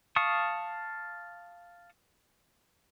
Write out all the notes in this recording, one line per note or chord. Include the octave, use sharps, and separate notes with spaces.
F5 A5 C#6 D#6